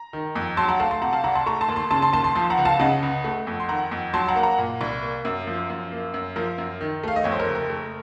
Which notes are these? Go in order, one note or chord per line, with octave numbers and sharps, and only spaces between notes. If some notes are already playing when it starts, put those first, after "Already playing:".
Already playing: A#5
D#3
F2
F#3 A5 C6
F#5 A#5
A3 F5 A5
A5 C6
C3 F#5 A#5
F5 A5
C2 F#5 A#5
A5 C6
A3 A#5 C#6
A5 C6
D#2
A5 C6
C#3 A5 C6
A5 C6
D#2 A5 C6
A5 C6
F3 A5 C6
F#5 A#5
C#2
F5 A5
C#3 D#5 F#5
C#2
A3
F2
C6
D#3 F#5 A#5
F2
F#3 A5 C6
F#5 A#5
A#3
F#5 A#5
A#2
C2
A#3
F#2
F3
F#2
A#3
F#2
F3 A#4
F#2
D#3
A3 F5
D#5
F2 C#5
C5
A#4
F#1
A#4
A3